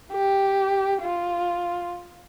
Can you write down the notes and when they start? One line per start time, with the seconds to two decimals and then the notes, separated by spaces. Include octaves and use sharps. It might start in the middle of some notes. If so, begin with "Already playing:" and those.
0.12 G4
1.03 F4